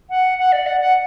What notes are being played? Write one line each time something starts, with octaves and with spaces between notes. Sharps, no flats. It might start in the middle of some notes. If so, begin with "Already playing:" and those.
F#5
F#5
D5
F#5
F#5